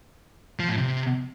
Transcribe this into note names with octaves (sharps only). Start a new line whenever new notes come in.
F3
A2
C3